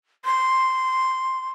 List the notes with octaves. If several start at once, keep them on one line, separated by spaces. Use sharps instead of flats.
C6